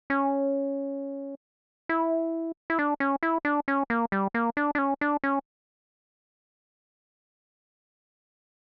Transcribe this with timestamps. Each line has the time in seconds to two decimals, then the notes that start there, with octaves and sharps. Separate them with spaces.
0.10 C#4
1.89 E4
2.70 E4
2.79 D4
3.00 C#4
3.23 E4
3.45 D4
3.68 C#4
3.90 A#3
4.12 G3
4.34 A#3
4.57 D4
4.75 D4
4.78 C#4
5.01 D4
5.24 C#4